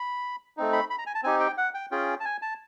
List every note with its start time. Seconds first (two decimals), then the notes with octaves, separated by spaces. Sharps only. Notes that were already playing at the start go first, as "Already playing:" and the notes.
Already playing: B5
0.57 A3 C4 D#4
0.73 B5
0.90 B5
0.98 A#5
1.06 G#5
1.15 A5
1.23 C4 D#4 G4 G#5
1.40 G5
1.58 F#5
1.74 G5
1.91 C#4 F4 G#4 G5
2.20 A5
2.25 G#5
2.42 A5